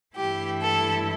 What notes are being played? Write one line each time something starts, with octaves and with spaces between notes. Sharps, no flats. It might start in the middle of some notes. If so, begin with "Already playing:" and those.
G2 E3 A3 E4 G4
A4